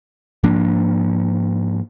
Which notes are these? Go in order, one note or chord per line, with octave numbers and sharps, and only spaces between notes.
G#2 F3 A#3 D4